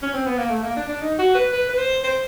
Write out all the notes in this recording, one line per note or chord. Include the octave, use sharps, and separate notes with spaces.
C#4
C4
B3
A#3
A3
A#3
D4
D4
D#4
F#4
B4
B4
B4
C5
C5